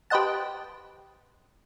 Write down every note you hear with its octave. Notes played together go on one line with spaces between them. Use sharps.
G4 B4 C5 D#5 F#5 A5